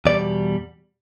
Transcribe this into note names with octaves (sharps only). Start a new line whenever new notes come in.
E2 B2 G3 D5